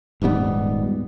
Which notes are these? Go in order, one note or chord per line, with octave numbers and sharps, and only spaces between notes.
D#1 G#2 G3 B3